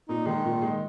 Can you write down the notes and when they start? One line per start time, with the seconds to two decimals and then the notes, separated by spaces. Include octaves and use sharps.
0.09 A#2 D#4
0.26 D#3 G#3 D#4
0.44 A#2
0.62 G#3 D#4